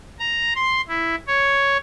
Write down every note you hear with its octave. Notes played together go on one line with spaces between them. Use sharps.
A#5
C6
E4
C#5